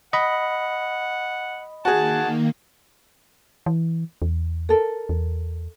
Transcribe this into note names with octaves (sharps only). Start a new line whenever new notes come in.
D#5 F#5 B5
D#3 A#3 F#4 G#4 A5
E3
E2
A4 A#4
E2